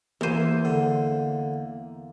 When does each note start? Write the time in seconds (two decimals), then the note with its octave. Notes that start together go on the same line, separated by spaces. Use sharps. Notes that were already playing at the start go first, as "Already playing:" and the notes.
0.21 E2 A#3 C5 D#7
0.65 D3